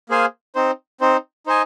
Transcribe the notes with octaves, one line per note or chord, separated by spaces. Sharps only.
A#3 G#4 C5 F5 G#5
C4 D#4 C5
C4 D#4 C5
D#4 C5 D#5 G#5